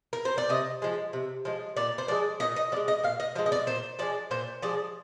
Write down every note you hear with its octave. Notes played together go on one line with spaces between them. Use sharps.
A#4
C5
D5
C3 D#5
F3 G#3
C3
F3 G#3
A#2 D5
C5
F3 G#3 D5
A#2 D#5
D#5
F3 D5
G#3
D#5
A#2 F5
D#5
F3 G#3 D#5
D#5
D5
A#2 C5
F3 G#3 D5
A#2 C5
F3 G#3 D5